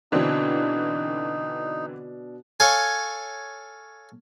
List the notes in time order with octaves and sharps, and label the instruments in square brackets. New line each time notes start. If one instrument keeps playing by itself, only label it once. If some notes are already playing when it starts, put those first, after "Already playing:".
[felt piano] B2 D4 [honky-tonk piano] D3 E3 C4 [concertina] D#4
[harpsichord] A4 C#5 F5 G#5